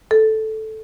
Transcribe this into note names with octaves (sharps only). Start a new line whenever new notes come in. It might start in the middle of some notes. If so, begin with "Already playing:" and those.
A4